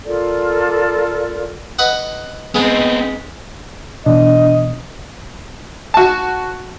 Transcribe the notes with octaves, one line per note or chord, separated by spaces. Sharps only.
F4 A4 A#4 D5
B4 D#5 F#5
G#3 B3 C4 D#4
B2 E3 B3 D4 D#5
F#4 A5